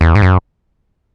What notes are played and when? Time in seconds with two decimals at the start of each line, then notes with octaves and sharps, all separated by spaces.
0.01 E2
0.15 G#2
0.22 F#2